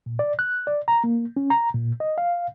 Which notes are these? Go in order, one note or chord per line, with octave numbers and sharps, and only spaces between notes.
A#2
D5
F#6
D5
A#5
A#3
C#4
A#5
A#2
D#5
F5